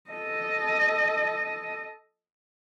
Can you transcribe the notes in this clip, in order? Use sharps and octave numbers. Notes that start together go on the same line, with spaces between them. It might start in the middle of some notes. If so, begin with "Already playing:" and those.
A4 D#5